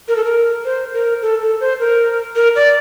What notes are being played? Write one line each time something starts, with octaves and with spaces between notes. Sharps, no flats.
A#4
A4
A#4
C5
A#4
A4
A4
C5
A#4
A#4
D5